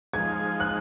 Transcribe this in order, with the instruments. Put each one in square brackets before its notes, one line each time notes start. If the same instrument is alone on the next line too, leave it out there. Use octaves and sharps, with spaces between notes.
[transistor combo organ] F3 G#3 D#4 [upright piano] G#6
[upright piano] F#6